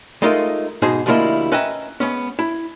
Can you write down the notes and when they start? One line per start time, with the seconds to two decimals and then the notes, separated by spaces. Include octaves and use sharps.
0.22 G#3 A3 D#4 F4 A#4 D#5
0.82 G#2 B2 D#4 G#4 C5 D#5
1.06 D2 F3 G3 A#3 E4 D#5
1.52 C#4 B4 D#5 E5 G5 A#5
2.00 G#3 B3 C#4
2.39 E4